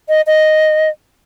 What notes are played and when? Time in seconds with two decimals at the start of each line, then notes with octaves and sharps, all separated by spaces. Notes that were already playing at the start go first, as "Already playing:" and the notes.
0.09 D#5
0.27 D#5